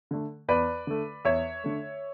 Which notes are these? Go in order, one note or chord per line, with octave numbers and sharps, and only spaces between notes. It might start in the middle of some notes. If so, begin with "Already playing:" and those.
D3 A3
E2 B4 D5
D3 A3
E2 C#5 E5
D3 A3